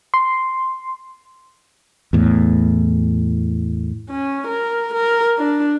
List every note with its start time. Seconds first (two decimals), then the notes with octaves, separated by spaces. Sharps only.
0.14 C6
2.13 E2 A2
4.10 C#4
4.47 A#4
4.94 A#4
5.38 D4